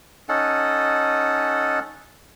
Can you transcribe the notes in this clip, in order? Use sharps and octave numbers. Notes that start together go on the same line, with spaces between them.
C#4 D#4 A4 F#5